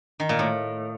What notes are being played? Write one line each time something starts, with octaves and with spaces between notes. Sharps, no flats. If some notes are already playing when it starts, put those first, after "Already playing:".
D#3
A#2
A2